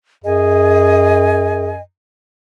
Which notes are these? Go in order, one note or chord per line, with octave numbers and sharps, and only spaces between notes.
F#2 G#4 D#5 G#5